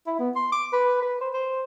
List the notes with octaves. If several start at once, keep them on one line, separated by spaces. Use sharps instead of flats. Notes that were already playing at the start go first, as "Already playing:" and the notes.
E4
B3
C6
D6
B4
B4
C5
C5